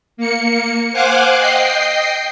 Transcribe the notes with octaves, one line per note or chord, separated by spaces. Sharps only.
A#3 C#7
C5 F5 F#5 G#5 D6 F#6
D#5 G5 C7